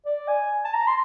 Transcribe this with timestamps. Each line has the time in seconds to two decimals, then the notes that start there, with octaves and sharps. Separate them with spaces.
0.05 D5
0.28 G#5
0.65 A5
0.74 A#5
0.87 C6